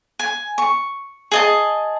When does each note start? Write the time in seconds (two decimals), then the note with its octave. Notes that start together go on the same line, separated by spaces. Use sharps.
0.19 G#5
0.58 C#6
1.32 G#4 D#5 A5